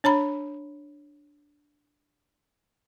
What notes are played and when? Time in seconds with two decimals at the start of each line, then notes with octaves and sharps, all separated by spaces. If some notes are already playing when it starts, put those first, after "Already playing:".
0.04 D4 C#5 A#5 B5